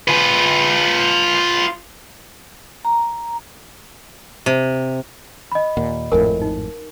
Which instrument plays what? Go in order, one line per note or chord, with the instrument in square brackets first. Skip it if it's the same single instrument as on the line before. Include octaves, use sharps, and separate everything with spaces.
[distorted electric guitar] F4 B4
[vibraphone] A#5
[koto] C3
[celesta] D#5 B5
[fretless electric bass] D#2 A#2 [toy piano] F#5
[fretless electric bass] G#1 F2 A2 [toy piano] A#4 G#5
[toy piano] D#4